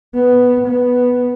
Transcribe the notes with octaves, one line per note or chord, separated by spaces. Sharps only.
B3
B3